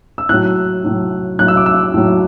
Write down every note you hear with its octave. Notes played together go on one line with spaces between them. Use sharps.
E6
A2 F#3 F#6
A2 F#3
A2 F#3 F#6
E6
D6
E6
A2 F#3